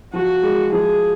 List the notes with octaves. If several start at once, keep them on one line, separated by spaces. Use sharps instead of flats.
F3 F#4
G#3
F3 G#4